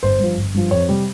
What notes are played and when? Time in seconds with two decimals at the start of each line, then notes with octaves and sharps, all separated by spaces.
0.03 G1 C5
0.20 G2 F3
0.37 G1
0.54 G2 F3
0.71 F2 C#5
0.89 C3 G3